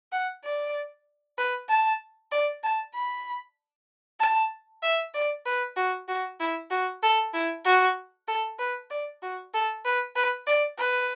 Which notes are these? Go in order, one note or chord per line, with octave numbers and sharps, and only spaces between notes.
F#5
D5
B4
A5
D5
A5
B5
A5
E5
D5
B4
F#4
F#4
E4
F#4
A4
E4
F#4
A4
B4
D5
F#4
A4
B4
B4
D5
B4